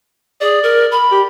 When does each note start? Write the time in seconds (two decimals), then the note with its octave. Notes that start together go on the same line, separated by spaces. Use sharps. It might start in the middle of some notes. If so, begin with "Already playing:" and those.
0.41 G#4 D5
0.63 A#4
0.92 B5
1.12 G4